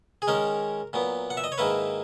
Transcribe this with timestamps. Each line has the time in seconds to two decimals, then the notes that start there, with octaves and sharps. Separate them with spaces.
0.22 G#4
0.27 D#3 G#3 C#4 A#4
0.93 A#2 F#3 B3
1.30 F#5
1.37 E5
1.44 D#5
1.52 C#5
1.58 G#2 D#3 A#3 E4 B4